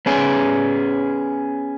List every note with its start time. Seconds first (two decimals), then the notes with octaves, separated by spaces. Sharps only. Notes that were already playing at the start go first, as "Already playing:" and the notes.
0.06 B3 C#4 G#4